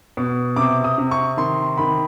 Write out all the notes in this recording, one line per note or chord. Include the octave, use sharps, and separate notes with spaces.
B2
C3 D6
D#6
C3
C#6
D#3 C6
D#3 B5